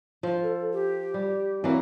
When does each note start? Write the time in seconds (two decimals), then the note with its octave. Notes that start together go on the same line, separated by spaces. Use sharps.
0.23 F3
0.43 A4
0.73 G4
1.14 G3
1.64 E3 F#3 A#3 C4